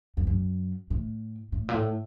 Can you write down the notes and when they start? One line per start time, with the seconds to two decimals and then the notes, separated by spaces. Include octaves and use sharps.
0.17 F2
0.27 F#2
0.90 A2
1.52 A2
1.69 A#2
1.74 A2